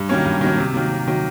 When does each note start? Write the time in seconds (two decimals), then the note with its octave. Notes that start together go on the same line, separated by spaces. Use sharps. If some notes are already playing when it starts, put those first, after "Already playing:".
Already playing: G2
0.09 D#3 F#3 A#3 C#4
0.25 G2
0.41 D#3 F#3 A#3 C#4
0.58 C3
0.74 D#3 F#3 A#3
0.91 C3
1.07 D#3 F#3 A#3